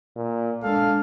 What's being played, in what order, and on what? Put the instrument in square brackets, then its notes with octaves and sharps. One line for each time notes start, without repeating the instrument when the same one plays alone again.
[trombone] A#2
[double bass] G#3 D4 [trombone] A4 [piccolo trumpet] F5